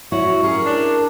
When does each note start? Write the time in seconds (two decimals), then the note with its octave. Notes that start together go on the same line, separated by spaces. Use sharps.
0.12 E4 F#4 C#5 E5
0.43 C#4 G#4 A#4
0.65 D4